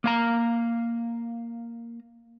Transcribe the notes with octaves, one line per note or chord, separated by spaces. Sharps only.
A#3 F5 A#5